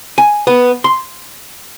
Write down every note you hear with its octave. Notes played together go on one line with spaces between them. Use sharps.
G#5
B3
C6